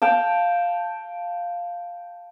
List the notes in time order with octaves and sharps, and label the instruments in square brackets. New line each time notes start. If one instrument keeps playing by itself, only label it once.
[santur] F5 G5 A5